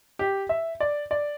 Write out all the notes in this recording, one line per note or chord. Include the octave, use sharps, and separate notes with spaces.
G4
E5
D5
D5